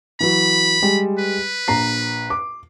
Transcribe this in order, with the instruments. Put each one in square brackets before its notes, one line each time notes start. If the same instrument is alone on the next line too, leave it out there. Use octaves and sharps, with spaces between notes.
[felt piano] E3 F#3 [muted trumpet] B5
[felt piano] G3 G#3
[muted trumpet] B4
[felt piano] A#1 A#5 C7
D6